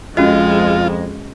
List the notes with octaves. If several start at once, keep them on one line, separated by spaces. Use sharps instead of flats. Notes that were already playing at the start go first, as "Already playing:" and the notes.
F2 G#3 C#4 F4 F#4 D#5